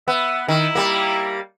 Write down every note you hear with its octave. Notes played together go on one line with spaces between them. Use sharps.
B3 E5
D#3 E4
G3 A#3